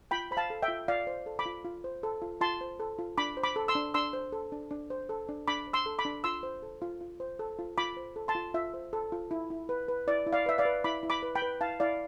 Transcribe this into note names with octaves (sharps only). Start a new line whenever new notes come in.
F4 G5 B5
C5 B5
F5 A5
A4
E5 G5
F4
F4 D5 F5
C5
A4
B5 D6
F4
F4
C5
A4
F4
F4 A5 C6
C5
A4
F4
D4 B5 D6
C5
B5 D6
A4
C6 E6
D4
D4 C6 E6
C5
A4
D4
D4
C5
A4
D4
D4 B5 D6
C5
C6 E6
A4
B5 D6
D4
F4 C6 E6
C5
A4
F4
F4
C5
A4
F4
F4 B5 D6
C5
A4
A5 C6
F4
F4 E5
C5
A4
F4
E4
E4
B4
B4
E4 D5
E4
D5 F5
B4 E5
D5 F5
B4
E4 B5 D6
E4
B5 D6
B4
G5 B5
B4
E4 F5 A5
E4 D5 F5